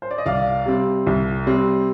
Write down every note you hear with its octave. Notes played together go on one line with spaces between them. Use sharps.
C5
D5
D#5
C2 D5 F5
C3 G3 C4
C2
C3 G3 C4